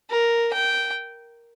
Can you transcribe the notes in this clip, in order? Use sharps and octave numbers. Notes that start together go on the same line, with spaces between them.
A#4
G5